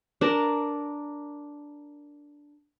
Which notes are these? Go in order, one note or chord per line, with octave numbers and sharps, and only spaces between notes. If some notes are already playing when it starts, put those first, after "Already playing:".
D4 A#4 A5 A#5